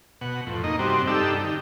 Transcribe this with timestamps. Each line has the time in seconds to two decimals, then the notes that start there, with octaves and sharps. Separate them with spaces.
0.21 B2 F#5
0.46 F2 A2
0.64 A#3 D#4 D#5
0.79 G2 C3 G3 C4 F#4
1.07 G2 D4 D#4 G4 A4 E6
1.44 D#3 G4